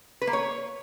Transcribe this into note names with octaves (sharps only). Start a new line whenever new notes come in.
B4
A#3
C#5